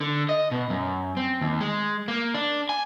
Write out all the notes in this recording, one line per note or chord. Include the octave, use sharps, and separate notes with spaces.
D3
D#5
B2
F#2
C4
D#2
G#3
A#3
D4
G#5